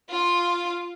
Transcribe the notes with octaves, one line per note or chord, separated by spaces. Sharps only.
F4 F5